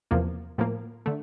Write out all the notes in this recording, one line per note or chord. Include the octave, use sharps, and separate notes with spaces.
E2 C3 F3 A#3
A2 F3 A#3
D3 A3